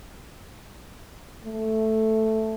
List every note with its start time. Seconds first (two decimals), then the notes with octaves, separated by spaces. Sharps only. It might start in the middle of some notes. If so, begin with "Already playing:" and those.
1.44 A3